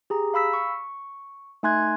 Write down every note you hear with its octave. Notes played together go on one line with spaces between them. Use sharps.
G4 G#4 A#5
F5 B5 E6 B6
C#6
A3 D#4 G#5 C6 F#6 G#6